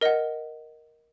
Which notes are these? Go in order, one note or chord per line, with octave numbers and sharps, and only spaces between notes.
A#4 D#5 F#5